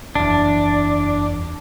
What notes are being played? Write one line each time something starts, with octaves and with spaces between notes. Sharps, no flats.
F#1 E2 D4